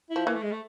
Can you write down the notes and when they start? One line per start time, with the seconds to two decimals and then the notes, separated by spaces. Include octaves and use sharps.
0.10 E4
0.16 F3
0.27 E3 A#3
0.35 A3
0.43 G#3
0.52 A3